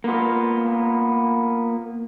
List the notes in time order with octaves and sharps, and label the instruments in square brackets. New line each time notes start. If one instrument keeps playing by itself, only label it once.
[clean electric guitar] A#3 B3 F4